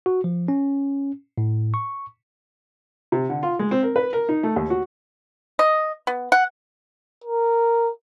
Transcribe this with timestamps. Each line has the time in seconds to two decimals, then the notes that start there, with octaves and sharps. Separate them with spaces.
0.06 F#4
0.24 F3
0.48 C#4
1.38 A2
1.74 C#6
3.12 C3
3.30 D3
3.43 F4
3.59 G#3
3.71 C4
3.83 A#4
3.96 B4
4.13 A#4
4.29 D#4
4.43 A3
4.56 D#2
4.70 F#4
5.59 D#5
6.07 B3
6.32 F#5
7.24 A#4